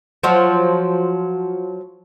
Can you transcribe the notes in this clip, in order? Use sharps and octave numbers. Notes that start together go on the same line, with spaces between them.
F3 F#3